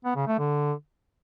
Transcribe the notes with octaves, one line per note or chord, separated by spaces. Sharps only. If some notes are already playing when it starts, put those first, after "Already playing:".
B3
C#3
A3
D3